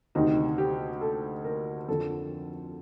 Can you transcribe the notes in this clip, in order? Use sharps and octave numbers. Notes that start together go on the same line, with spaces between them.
D2 C3 D#3 D#4
G4
A4
A#4
F2 D3 F3 A4